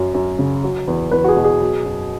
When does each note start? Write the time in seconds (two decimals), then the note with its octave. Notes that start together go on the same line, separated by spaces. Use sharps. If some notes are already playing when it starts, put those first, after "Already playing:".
Already playing: F#2 F#3
0.14 F#2
0.39 C#3
0.64 F#3
0.87 E2
1.11 E2 B4
1.24 F#4
1.29 G#4
1.37 B2
1.44 G#4
1.61 F#3
1.85 F#2